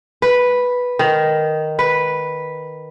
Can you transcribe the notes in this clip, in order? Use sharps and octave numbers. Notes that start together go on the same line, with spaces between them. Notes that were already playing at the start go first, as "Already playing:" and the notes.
B4
D#3
B4